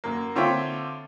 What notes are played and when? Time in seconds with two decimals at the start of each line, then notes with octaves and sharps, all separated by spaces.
0.04 F#2 A#3
0.35 D3 C4 F4 C#5 E5 G5